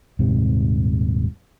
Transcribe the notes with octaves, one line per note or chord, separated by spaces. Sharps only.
D#1 G#2 C3